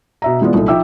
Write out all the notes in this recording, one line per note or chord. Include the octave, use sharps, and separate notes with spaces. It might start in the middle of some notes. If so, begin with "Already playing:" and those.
B2 E5 A#5
E3 G#3 B3 F4 D5
C2 A#2 D#4 A4
F3 D#4 E5 G5 D6 E6